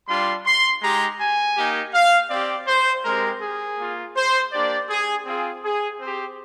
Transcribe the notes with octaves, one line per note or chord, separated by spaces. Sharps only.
G3 D4 F4 C6
C6
G#3 D#4 G4 A#5
G#5
A#3 D#4 G4
F5
C4 G4 D5
C5
G#3 C4 G4 A#4
G#4
A#3 F4
C5
A#3 D4 G4 D5
G#4
C4 F4 G#4
G#4
C4 G4 C5